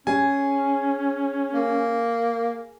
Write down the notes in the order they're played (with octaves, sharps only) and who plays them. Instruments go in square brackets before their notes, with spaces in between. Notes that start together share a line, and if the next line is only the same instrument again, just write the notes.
[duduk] C#4 [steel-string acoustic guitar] G#4 [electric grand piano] G#5
[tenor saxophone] A#3